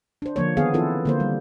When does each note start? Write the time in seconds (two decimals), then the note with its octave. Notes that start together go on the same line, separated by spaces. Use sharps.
0.22 D4 C5
0.36 D3 F3 A#3 C#5
0.57 D#3 B3 G#4 F5
0.74 E3 C4 E4 F4 A4 B4
1.05 D3 A#3 C5
1.20 G3